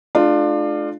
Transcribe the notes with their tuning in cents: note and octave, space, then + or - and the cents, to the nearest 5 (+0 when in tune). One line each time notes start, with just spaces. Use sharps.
A3 -45 D4 +25 F4 +0